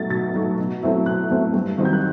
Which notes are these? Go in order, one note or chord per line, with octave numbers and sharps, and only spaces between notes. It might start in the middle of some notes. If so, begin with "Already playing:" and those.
Already playing: B2 F#3 A3 D#4 A6
B2 A6
F#3 A3 D#4
B2
F#3 A3 C4 E4
B2 F#6
F#3 A3 C4 E4
G2
D#3 F#3 C4 D#4
G6
F#6